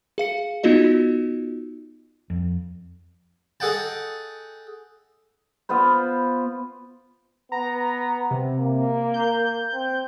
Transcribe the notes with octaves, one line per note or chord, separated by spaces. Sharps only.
G#4 F5 C#7
B3 D#4 F4 F#4 D#5
F2
G#4 A4 D#5 F#5 G5 A5
B3 F4 B4 C5
B3 A#5
C3
A#3
G6
C4